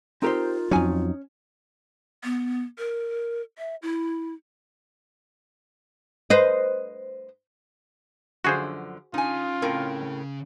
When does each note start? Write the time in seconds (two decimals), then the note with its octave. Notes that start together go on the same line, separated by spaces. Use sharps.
0.22 C4 D#4 F4 G4 A#4 C5 A#5
0.71 F2 F#3 C#4 D#4 G#5
2.24 B3
2.78 A#4
3.58 E5
3.82 E4
6.30 B4 C5 D#5
8.44 F#2 D3 F3 F#4 G#4 C5
9.14 C#3 C#4 D#4 F4 G#5
9.62 A2 C4 A#4